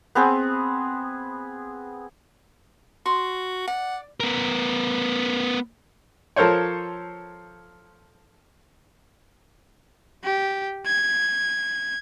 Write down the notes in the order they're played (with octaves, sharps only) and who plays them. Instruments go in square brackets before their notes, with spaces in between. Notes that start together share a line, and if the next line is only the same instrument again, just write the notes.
[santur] B3 C4 G#4
[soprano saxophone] F#4 [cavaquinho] C6
[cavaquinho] D5 [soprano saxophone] F#5
[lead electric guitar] B3 A#4
[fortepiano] F3 A4 A#4 C5 C#5
[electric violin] G4
G#6